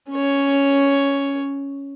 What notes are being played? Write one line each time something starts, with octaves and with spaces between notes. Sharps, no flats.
C#4 C#5